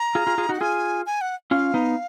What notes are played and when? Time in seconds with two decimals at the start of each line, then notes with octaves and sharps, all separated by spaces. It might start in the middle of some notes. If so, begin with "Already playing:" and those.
Already playing: A#5
0.15 F4 G#4
0.27 F4 G#4
0.38 F4 G#4
0.49 D#4 F#4 F#5
0.61 F4 G#4 G#5
1.06 G#5
1.21 F#5
1.51 C#4 F4 F5
1.74 B3 D#4